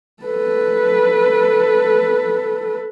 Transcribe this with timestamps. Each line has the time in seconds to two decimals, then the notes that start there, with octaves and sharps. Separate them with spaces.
0.23 A4 B4